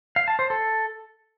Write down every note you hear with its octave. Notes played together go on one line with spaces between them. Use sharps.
F5
A5
C5
A4